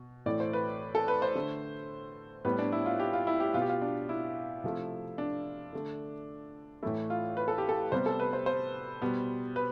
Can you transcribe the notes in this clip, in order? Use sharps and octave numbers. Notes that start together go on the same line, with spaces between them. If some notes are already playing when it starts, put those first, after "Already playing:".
Already playing: B2
A2 E3 A3 D5
C5
B4
A4
B4
C5
D3 A3
A2 G3 B3 B4
D4
E4
F4
G4
F4
E4
G4
B2 B3 F4
G4
F4
D4
E4
C3 F3 A3
D4
D3 A3
A2 E3 A3 E4
F4
B4
A4
G4
A4
C3 G3 B3 C5
A4
B4
C5
C5
B2 G3 B3
B4